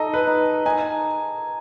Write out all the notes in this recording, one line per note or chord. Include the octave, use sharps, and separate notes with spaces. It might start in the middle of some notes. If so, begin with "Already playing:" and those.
Already playing: D#4 A4 D#5
B4
D#4
D#4 G#5